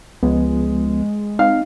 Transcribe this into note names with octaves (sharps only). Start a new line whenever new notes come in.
C#2 F3 G#3 B3
C4 D#4 F5